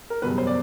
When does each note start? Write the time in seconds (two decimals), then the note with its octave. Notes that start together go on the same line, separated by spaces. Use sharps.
0.10 A#4
0.22 F#1 E2 B2 G3 B4
0.38 C5
0.47 D5